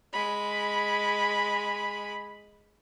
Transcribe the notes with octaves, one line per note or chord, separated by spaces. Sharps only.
G#3 B5